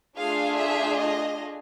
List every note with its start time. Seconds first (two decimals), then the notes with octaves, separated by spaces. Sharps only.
0.18 A3 D4 F4 G#4 F5
0.58 E5
0.98 D#5